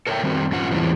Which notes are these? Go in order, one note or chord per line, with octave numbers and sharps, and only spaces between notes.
A4 A#4 C#5 D#5 E5 G5
D#3 G3 C4 F#4
F#2 C#4 F4 F#5
E2 A2 E3 G3 C4